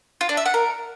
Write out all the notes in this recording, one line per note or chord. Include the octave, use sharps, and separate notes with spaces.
F4
D4
E5
F#5
A#4